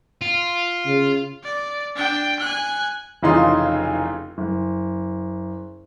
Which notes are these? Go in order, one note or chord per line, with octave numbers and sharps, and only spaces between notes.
F4
C#3
D5
D4 G5
G#5 F#6
F1 C#3 E3 D#4 F4 C6
F#1